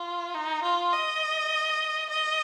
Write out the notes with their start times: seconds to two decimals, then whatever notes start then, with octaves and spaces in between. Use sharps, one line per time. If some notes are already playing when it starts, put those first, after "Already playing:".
Already playing: F4
0.35 D#4
0.63 F4
0.93 D#5
2.10 D#5